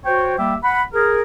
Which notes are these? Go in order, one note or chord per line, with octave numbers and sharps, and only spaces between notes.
F#4 C5 C#5 G5
G3 A#3 G4 E5 G5
F#5 B5
G#4 A#4